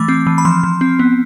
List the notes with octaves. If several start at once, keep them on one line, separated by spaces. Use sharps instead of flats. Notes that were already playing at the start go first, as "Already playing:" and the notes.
Already playing: E3 A3 D6
C4
E3
B5
F3 C6
F3
C4
B3